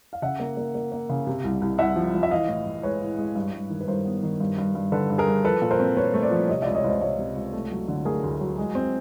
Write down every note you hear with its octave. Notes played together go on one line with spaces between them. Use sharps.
F5
C#3 E5 F#5
A#3
A#3
A#3
A#3
C#3
C3
C2
C2
C2 E5 F#5
F3
F3
E5
E3 D#5 F5
A2
A2
G#3 B4 C#5
A2
G#3
G2
G2
D#3
B4
G2 A#4 C5
B3
D#3
G2
G2
G2
D3 A4 B4
G2
G#4 A#4
G2
F3 A4 B4
A#2
A#4 C5
C4
C4 B4 C#5
A3
C5 D5
F3
C3 C#5 D#5
C#2 D5 E5
C#5 D#5
C#2 C5 D5
C#2 C#5 D#5
C3
C#2
A3
F#3
D3
A3 G#4 A#4
D2
F#3
G#3
C4